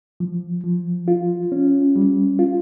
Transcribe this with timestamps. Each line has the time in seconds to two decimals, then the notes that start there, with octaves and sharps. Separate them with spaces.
0.20 F3
0.64 F3
1.08 F4
1.52 C#4
1.96 G3
2.39 F4